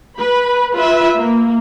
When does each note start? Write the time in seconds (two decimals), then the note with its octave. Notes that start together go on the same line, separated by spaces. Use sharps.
0.17 B4 B5
0.75 F4 B4 E5
1.17 A#3